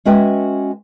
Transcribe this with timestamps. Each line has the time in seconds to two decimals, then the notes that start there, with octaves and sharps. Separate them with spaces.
0.05 G#3 C#4 F#4 B4 E5 G5